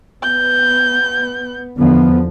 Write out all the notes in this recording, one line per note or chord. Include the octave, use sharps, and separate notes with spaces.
B3 G6
E2 D3 F3 B3